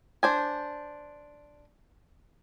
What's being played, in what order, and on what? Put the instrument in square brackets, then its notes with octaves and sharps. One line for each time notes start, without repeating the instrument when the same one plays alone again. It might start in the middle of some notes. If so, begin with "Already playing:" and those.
[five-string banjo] D4 C5 G#5